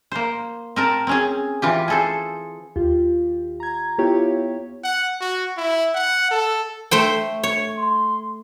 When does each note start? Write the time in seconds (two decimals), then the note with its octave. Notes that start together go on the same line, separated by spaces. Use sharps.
0.12 A#3 C5
0.76 C4 A#4 A5
1.07 C4 C#4 G#4
1.62 E3 F4 G4
1.88 G#4 A4 C5
2.76 D#2 F4 G4
3.60 A#5 G#6
3.98 B3 E4 F4 G4 C#5
4.84 F#5
5.21 F#4
5.57 E4
5.94 F#5
6.31 A4
6.91 A3 C5 G5
7.43 C#5
7.77 C6